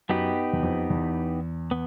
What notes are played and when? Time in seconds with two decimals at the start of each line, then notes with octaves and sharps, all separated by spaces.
0.09 F#2 B3 D#4 G4 B4
0.53 E2
0.63 F2
0.90 E2
1.71 B3